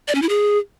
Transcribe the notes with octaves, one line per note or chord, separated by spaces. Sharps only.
D5
C#4
E4
G#4